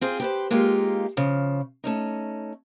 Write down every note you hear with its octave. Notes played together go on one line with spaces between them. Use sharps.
C4 F4 G#4 C5
G4 B4 C5
G#3 A#3 D#4 F4 G4
C#3 F3
A3 C#4 D#4